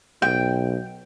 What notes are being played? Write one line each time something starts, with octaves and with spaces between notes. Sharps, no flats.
B1 G5